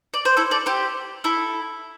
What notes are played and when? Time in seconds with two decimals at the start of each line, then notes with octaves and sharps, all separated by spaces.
0.14 D5
0.25 C5
0.37 E4 A4
0.51 A4 D5
0.66 G4 C5
1.24 E4 A4